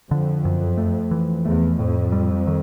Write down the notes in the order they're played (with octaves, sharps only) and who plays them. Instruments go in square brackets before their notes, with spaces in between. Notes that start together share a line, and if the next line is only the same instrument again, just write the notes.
[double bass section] F2 [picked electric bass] D3
[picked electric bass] F#2
A3
E3
[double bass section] E2 [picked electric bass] A3
[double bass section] F2 [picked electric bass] A2
[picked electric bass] G3
D#3